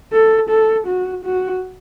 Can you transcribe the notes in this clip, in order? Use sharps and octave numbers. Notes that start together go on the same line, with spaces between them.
A4
A4
F#4
F#4